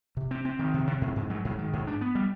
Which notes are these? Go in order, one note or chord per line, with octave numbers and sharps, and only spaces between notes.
C3
C4
C4
D#3
C3
C3
G#2
G#2
F#3
G#2
D#3
G#2
D4
B3
G3